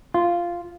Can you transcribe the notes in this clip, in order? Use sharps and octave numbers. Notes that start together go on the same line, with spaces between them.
F4